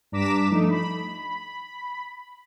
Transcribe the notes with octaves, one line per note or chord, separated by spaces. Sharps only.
G2 D4 A#5 D6 B6 E7
F3 A3 D#4
B5